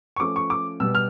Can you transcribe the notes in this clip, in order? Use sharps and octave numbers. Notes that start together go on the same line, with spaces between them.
C#6
F3 A3 C#4 D6
C#6
D6
B2 G3 B3 E6
F6